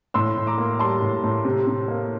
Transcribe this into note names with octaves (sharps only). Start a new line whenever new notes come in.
A2 C6 E6
A2
A#5 D6
A#3
G3 A5 C6
A2
A2
C3
C3
A#3